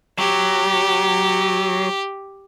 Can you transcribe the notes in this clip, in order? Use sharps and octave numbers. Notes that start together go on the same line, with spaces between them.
F#3 G4